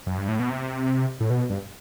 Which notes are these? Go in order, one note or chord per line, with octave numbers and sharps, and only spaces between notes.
F#2
G2
A2
B2
C3
A2
B2
G2